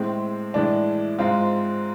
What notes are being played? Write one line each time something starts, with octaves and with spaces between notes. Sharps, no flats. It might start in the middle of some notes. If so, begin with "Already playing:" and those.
Already playing: A2 G#3 C4
A2 E3 G#3 D4
G#2 G#3 C4 F4